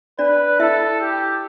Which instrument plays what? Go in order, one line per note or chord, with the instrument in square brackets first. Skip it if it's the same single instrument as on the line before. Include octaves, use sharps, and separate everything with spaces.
[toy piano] D4 D5 [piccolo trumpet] B4
[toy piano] E4 E5 [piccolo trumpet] A4
[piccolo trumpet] G4